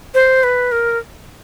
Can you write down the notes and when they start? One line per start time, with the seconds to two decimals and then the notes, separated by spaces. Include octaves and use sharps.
0.14 C5
0.43 B4
0.72 A#4